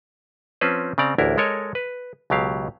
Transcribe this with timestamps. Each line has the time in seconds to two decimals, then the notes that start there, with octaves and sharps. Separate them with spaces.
0.61 F3 C4 C#4 B4 C5
0.98 C#3 C4 D5 A#5
1.18 A1 D2 D4 E4 A#4
1.38 G#3 A4 A#4 C#5 D#5
1.75 B4
2.30 C#2 B2 F#3 G4 F5